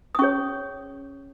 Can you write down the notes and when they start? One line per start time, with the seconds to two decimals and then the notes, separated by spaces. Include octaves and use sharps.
0.15 D#6
0.19 C#4 G#4 C#5 C#6